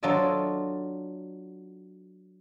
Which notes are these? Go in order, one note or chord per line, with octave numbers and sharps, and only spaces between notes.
F#3 D4 F4 A4 D5 D#5